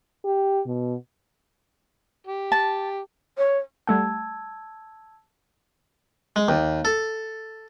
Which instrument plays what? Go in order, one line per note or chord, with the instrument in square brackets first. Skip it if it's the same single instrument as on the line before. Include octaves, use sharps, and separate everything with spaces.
[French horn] G4
B2
[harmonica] G4
[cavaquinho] A5
[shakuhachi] C#5
[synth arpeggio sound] G3 A3 F#5 [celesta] A5 E6 G#6
[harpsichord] G#3
D#2
A4